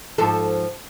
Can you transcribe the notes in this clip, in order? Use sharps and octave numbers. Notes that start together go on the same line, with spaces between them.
G#2 F3 A4